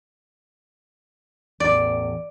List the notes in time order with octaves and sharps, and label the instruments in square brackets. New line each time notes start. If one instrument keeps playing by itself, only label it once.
[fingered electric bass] A1 E2 [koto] D5